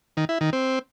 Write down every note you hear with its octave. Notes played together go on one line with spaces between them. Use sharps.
D#3
E4
D#3
C4